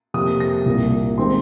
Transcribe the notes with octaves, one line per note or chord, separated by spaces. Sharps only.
F2 C3 F3 A#3 D#6
A#6
C2 A#2 A#3
D#3 G#3 C4 C6